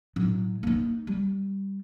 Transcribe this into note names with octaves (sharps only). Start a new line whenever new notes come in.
A2 F#3
A#3 D#4
G3